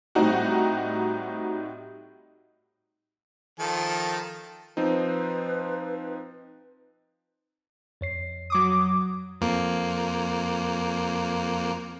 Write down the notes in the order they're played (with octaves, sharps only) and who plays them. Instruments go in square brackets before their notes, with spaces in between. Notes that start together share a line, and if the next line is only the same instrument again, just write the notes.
[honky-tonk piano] A2 G3 C4 D#4 F#4
[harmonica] D#3 F3 A4
[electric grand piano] F3 C4 D#4 [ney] B4
[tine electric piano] F2 C#5 C7
[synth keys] F#3 D6 D#6
[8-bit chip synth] F2 A#3